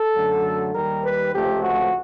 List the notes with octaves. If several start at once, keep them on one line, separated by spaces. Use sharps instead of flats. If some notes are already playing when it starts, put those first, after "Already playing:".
Already playing: A4
F#2 D3 F#3 A3
D#2 D#3 G3 A#4
B4
C#2 C3 F3 A3 G4
F#4